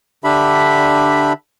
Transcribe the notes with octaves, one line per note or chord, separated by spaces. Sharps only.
D3 D4 G4 E5 B5